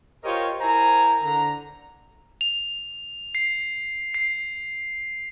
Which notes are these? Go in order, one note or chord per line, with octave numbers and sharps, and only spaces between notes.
F4 G4 A#4 C5 C#5 D#5
E4 A#4 C5 G#5 A#5
D3 A#5
F7
C7
C7